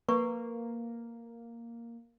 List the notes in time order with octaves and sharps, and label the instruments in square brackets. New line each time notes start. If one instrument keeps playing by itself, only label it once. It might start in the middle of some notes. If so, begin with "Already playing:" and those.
[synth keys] A#3 [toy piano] B4 C#6